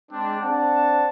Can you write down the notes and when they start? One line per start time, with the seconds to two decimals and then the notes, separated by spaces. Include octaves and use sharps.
0.12 G#3 C4 D4
0.42 C4 D4 F#5 A5